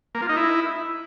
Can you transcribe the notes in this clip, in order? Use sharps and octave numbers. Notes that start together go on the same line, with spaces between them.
A#3
F4
D#4
E4